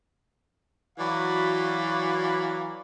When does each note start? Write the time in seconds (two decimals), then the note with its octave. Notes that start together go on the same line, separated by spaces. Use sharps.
0.98 E3 F#3 F#4 D5 F5 B5